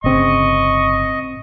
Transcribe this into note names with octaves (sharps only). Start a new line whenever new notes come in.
G1 A2 C#3 C4 D#5 C#6